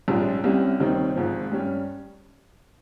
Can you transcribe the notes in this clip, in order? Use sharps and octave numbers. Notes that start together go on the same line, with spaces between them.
A#1 G#2 G3 C#4
C2 C3 G3 C#4
D#2 D#3 G3 C4 D#4
G#1 G#2 F3
G2 G3 C#4